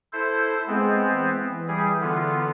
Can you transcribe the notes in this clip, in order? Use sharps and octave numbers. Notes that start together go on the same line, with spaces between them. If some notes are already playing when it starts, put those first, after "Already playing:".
E4 A4 C5
G#3 B3 C4
E3
G3 G#4
D3 B3 F4